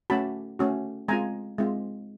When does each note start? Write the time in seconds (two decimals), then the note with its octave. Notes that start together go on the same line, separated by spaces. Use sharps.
0.10 A3 C#4 F#4 A5 B5
0.59 A3 C#4 F#4
1.08 G#3 C4 F4 G#5 A#5
1.58 G#3 C4 F4